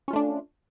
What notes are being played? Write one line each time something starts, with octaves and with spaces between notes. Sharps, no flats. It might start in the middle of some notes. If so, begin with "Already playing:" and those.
A3 C#4 D4 F4